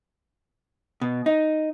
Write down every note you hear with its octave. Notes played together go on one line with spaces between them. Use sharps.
B2
D#4